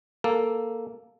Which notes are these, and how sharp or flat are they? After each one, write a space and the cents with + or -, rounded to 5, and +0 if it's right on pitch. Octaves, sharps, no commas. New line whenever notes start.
A#3 +0 A4 +0